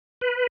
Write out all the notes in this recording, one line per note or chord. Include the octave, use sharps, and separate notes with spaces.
B4